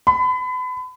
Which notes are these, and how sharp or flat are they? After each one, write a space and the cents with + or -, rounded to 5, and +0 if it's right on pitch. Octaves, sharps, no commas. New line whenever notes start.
B5 +35